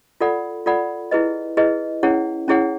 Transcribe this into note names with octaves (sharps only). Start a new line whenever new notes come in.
F4 A4 D5 F#5 B5
F4 A4 D5 F#5 B5
E4 G#4 B4 D#5
E4 G#4 B4 D#5
C#4 E4 G#4 C#5 F#5
C#4 E4 G#4 C#5 F#5